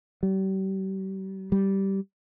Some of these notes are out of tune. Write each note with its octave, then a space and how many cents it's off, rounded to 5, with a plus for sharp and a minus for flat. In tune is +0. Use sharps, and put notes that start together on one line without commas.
G3 -40
G3 -10